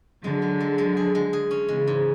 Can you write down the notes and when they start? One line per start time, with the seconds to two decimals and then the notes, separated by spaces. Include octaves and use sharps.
0.24 D3 F#3 G#3
0.42 G#3
0.60 G#3
0.78 G#3
0.97 G#4
1.15 G#3
1.33 G#4
1.51 C#4
1.68 C#3 E3 G#3
1.87 G#2